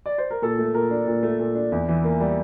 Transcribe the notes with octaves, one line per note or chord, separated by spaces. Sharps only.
D5
C5
A#4
A#2 A4
A3
A#2 A#4
D4
A#2
A3
A#2
D4
E2
E3
A#3
G3